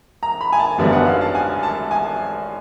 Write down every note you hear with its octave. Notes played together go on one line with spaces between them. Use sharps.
A#5
B5
G#5
A5
G#1 F#2 D3 G3 B3 G#5
F#5
F5
A5
G#5
A5
G#5